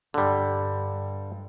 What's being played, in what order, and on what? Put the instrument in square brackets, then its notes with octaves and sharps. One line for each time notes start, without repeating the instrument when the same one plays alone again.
[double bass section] G2 [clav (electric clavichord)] D3 G3